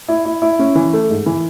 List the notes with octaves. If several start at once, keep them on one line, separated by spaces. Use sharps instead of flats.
E4
E4
E4
C#4
E3
A3
G#2
E3